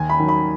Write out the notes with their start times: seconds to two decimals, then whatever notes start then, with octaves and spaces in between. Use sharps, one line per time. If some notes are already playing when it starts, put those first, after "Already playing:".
Already playing: D#2 G#5
0.10 B5
0.20 D#3 F#3
0.29 B5